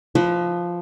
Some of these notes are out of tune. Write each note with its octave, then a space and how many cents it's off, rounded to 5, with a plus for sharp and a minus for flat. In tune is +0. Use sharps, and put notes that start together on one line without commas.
F3 +0 B4 +20 D#5 +45